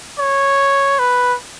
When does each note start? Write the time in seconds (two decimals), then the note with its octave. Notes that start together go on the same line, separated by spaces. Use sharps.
0.19 C#5
0.99 B4